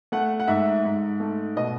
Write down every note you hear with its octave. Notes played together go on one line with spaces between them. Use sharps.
A3 F#5
F#5
G#2 E5
G#2
A3
B2 D#5